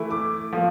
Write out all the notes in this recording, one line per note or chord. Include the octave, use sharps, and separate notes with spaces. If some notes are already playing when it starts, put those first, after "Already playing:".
Already playing: E3 A3 E4
D6
F3 A3